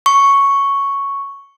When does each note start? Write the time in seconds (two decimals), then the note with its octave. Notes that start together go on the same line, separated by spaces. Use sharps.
0.06 C#6